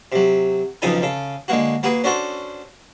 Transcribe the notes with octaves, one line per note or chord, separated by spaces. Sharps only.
C3 F#3
B1 F2 C#3 D#4 A4 G#5
C#3 A4
D3 G#3 A#3 F#4
A#3 F#4 G#4 B4
C#4 D4 F#4 A4 C5